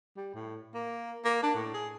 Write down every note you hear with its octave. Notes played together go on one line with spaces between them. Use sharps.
G3
A2
A#3
A#3
D4
A2
G#4